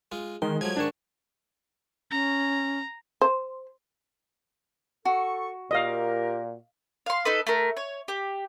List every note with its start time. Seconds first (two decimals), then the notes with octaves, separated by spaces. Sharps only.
0.12 G#3 F4
0.42 D#3 G#3 C6
0.61 F3 F#3 A3 G#6
0.77 G#2 D#3 D4 C#6 E7
2.11 C#4 A#5
3.22 C5
5.05 F#4 A4 C#6
5.71 A#2 F4 G4 A#4 D#5 F5
7.06 F5 C6
7.25 D#4 A4 B4
7.47 A3 A#4
7.77 C#5
8.08 G4